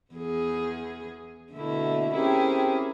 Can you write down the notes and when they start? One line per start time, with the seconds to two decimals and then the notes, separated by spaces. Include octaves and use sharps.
0.13 E2 G#4
1.52 B2 D3 A3 A#3 E4
2.14 C4 C#4 E4 G4 G#4 A#4